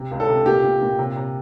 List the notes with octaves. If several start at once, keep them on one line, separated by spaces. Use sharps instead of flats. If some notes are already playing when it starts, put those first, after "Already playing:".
Already playing: C3
C#2
A4
C3
A#2 G4
A#2
A#2
C3
C3